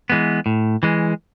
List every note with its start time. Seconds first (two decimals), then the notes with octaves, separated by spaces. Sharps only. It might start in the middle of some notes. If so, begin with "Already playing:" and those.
0.10 E3 G#3 B3
0.46 A2
0.83 E3 G#3